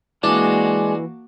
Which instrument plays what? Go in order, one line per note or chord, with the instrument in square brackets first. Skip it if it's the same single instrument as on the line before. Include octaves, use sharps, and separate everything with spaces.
[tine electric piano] E3 [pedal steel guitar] G#3 [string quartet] A#3 F#4 [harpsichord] D4